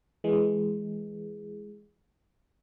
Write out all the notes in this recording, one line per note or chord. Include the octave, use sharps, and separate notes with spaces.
E3 G#3